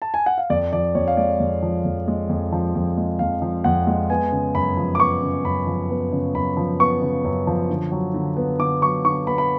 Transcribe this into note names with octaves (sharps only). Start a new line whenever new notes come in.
A5
G#5
F#5
F5
F2 D5
F3 D5
F2 C#5
F5
G#3 D5
F2
F3
F2
G#3
F2
F3
F2
G#3
F2 F5
F3
F2 F#5
G#3
B3 G#5
C#3
F#2 B5
F3
D6
B3 C#6
C#3
F#2 B5
F3
B3
C#3
F#2 B5
F3
B3 C#6
C#3
F#2
F3
D3
F#3
D3
B3
D3 D6
F#3 C#6
D3 C#6
B3 B5
B5